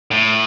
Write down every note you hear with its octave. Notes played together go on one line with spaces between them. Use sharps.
A2